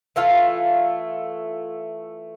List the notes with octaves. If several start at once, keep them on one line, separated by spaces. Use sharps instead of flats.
E3 A3 F4 F5